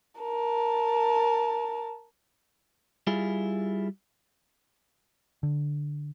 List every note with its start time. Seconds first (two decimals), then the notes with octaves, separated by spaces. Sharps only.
0.21 A#4 A5
3.07 G3 E4 F4 G#4
5.43 D3